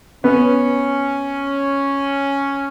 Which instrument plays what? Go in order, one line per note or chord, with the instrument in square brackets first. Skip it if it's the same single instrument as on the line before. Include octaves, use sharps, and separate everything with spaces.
[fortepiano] B3 [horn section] C#4